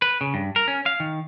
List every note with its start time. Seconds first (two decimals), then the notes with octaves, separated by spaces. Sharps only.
0.02 B4
0.21 C#3
0.34 G2
0.56 A#4
0.68 C#4
0.86 F5
1.00 D#3